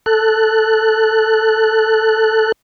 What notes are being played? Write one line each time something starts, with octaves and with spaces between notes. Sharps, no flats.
A4 F#6